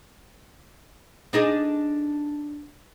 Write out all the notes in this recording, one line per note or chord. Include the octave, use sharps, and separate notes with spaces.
D4 D#4 G#4